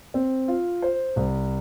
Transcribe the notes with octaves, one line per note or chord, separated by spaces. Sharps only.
C4
F4
C5
C2